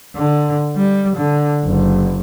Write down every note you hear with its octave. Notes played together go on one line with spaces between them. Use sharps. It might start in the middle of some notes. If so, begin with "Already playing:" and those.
D3
G3
D3
F#1